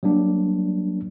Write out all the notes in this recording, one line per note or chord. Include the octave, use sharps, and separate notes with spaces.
F#3 G3 A#3 D4